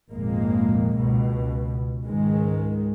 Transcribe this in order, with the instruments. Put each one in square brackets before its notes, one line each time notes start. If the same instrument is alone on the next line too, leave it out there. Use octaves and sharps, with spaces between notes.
[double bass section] G#1 F2 A#2 G#3 A#3
C#2 B2
C#2 G#2 D#3 G#3